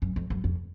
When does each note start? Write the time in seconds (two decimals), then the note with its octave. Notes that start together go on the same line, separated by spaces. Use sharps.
0.02 F#2
0.16 F2
0.30 F#2
0.44 F2